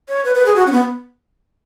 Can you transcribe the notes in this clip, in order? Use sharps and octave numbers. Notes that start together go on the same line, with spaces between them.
C#5
B4
B4
G#4
F#4
C#4
B3